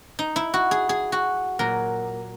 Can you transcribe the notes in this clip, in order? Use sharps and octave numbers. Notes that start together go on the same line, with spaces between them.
D#4
E4
F#4
G#4
G#4
F#4
A#2 F#3 A#4